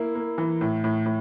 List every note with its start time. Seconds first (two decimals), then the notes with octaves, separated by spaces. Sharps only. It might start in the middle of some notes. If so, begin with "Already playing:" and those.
Already playing: A#3 E4
0.15 A#3
0.38 E3
0.61 A2
0.84 A2
1.06 A2